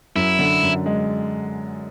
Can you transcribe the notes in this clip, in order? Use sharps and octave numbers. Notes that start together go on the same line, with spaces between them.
F#2 E4
D3
F#2
G#3